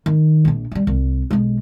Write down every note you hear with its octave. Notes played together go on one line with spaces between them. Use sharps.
D#3
A#1 D4
F3 G3
C2
B1 G#3